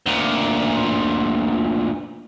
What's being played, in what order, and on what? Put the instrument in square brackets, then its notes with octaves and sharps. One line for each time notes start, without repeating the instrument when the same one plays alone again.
[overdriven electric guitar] D2 A#2